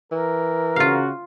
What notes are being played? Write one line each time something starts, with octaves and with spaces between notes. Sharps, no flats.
E3 A#4
C#3 F4 F#4 F5